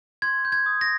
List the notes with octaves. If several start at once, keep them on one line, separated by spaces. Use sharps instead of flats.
C6 G#6
G6
G#6
D#6
A#6